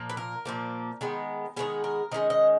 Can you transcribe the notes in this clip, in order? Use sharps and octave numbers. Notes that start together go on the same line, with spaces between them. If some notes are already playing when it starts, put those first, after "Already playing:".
Already playing: A#2 F3 A#3
B4
A#4
A#2 F3 A#3
D#3 G#3 B3
D#3 G#3 B3 G#4
A#4
D#3 G#3 C#4 D#5
D#5